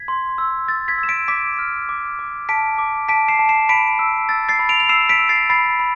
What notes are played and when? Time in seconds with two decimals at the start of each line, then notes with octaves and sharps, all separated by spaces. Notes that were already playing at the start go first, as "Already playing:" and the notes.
Already playing: G#6 B6
0.08 C6
0.38 E6
0.68 E6 A6
0.88 G#6 B6
0.98 E6
1.03 E7
1.09 B6 D7
1.28 D6 B6 D7
1.59 F6
1.89 D6
2.19 D6
2.49 A5 B6 D7
2.78 D6
3.08 A5 B6 D7
3.28 C7 E7
3.39 A5
3.49 C7 E7
3.69 B5 B6 D7
3.99 E6
4.29 E6 A6
4.49 A6 C7
4.59 B5
4.69 D7 F7
4.80 F7
4.89 E6 C7 E7
5.09 B6 D7
5.19 E6
5.29 A6 C7
5.50 B5 A6 C7
5.80 B5